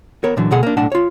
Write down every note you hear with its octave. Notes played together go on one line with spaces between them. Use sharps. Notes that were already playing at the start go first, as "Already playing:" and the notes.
B3 A#4 C#5
A#2 D3 E3 F#3
D2 B2 G#4 F#5
A#3 D4
B1 A2 D4 F#5 A5
F4 C#5